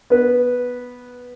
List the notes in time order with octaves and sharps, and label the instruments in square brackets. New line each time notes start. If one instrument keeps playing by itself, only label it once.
[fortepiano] B3 B4